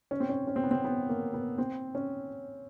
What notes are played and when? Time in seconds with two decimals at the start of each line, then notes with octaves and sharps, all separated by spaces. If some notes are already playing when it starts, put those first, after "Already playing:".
0.11 C#4
0.20 C4
0.29 C#4
0.47 C#4
0.56 C4
0.63 B3
0.71 C4
0.84 B3
1.09 A#3
1.34 B3
1.58 C4
1.95 C#4